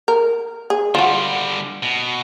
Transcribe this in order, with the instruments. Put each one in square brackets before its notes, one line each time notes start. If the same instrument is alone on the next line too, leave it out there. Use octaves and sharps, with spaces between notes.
[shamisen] A#4
G#4
[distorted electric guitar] D3 G3 [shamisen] F4 F#4
[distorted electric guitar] B2